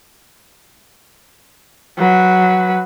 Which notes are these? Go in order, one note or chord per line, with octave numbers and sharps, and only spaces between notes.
F#3 B4